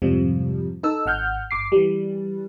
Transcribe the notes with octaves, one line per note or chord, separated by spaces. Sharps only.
F2 G#2 C3 F3 G3
D#4 A4 E6
G#1 F#5 F6 G6
G1 D6 C7
E3 G3